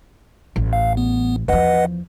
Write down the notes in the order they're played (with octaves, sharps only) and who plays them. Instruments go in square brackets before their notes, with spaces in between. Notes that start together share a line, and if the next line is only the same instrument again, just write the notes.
[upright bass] A1
[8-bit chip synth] F5
B3
[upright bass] E2 F3 [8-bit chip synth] B4 D#5 F#5